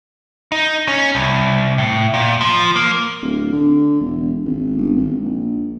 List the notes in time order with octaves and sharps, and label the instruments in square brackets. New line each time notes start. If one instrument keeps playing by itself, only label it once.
[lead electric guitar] D#4
C#4
C2
A2
A#2
F3
A#3
[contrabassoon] D1
D3
E1
G#1
G1
G#1
A#1